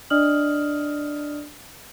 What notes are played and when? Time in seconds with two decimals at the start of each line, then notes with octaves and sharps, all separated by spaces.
0.10 D4 D5 D#5 D#6 F6 F#7